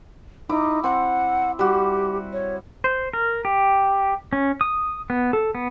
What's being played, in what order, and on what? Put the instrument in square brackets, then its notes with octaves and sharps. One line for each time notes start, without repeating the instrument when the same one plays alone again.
[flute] D#4 [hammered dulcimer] E4 D6
[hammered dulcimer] C4 [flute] F#5
[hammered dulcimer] G3 F#4 [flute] G4
[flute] C#5
[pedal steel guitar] C5
A#4
G4
C#4
D#6
B3
A4
B3